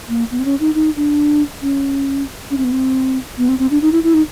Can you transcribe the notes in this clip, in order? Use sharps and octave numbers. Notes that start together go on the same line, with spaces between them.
A#3
B3
C4
C#4
D#4
D#4
D4
C#4
C#4
C4
B3
C4
B3
C4
C4
D4
D#4
E4
E4
D#4